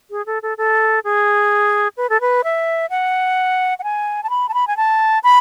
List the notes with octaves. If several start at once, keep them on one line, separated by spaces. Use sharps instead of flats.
G#4
A4
A4
A4
G#4
B4
A4
B4
E5
F#5
F#5
G#5
A5
B5
A5
B5
G#5
A5
B5